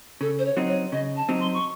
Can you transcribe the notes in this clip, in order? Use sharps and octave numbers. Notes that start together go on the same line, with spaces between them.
C#3 A4
C5
C#5
F#3 C4 D#4
C#5
C#3 D#5
A5
F#3 C4 D#4
C6
C#6